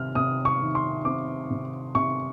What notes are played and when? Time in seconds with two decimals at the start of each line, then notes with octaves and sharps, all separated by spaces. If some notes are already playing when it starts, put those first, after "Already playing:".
Already playing: C3 D#3 F6
0.15 C3 D#6
0.45 C#6
0.61 D#3
0.75 C6
1.05 C4 D6
1.50 C3
1.95 C3 C#6